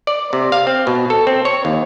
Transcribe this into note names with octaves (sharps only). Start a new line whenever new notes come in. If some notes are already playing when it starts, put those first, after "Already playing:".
D5
C3
F5
C4
B2
A4
C4
C#5
D#2